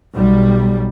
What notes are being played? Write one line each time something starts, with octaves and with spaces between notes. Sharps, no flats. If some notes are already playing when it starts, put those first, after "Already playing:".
B1 G3